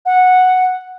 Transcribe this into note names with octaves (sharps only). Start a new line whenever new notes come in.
F#5